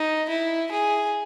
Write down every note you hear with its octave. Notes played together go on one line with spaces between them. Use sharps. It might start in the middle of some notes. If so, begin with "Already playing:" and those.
Already playing: D#4
E4
G#4